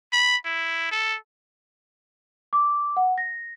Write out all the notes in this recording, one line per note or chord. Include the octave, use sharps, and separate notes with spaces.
B5
E4
A4
D6
F#5
A#6